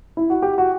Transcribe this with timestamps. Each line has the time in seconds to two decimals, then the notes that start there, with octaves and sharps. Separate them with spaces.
0.17 E4
0.30 F#4
0.42 G4
0.58 F#4